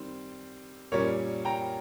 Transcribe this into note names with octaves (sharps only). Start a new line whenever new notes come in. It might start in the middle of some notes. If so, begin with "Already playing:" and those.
Already playing: D#3 G3 C4
A#2 G3 C#4 A#4 C#5
G5 A#5